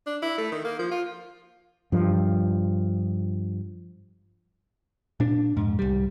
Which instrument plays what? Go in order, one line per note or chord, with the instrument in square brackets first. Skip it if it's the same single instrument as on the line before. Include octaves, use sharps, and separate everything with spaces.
[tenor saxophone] D4
E4
A3
D#3
A#3
F3
F4
[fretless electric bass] G2 F3
[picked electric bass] A#2 D4
F2 G#2
C2 G3